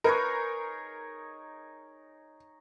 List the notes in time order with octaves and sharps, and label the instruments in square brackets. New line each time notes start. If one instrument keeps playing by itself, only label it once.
[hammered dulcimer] D#4 G#4 C#5 [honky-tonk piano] A#4 [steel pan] B4